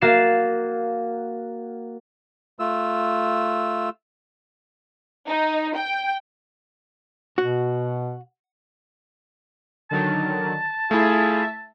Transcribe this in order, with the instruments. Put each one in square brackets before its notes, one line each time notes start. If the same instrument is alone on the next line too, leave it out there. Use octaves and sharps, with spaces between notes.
[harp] A#3 F#4 F5 A6 C7 E7
[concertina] A3 F4 E6
[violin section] D#4
G5
[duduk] B2 [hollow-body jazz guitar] F#4
[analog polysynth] D3 D#3 F#3 [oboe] A5
[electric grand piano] A3 E4 [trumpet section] F4 G#4 [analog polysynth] E5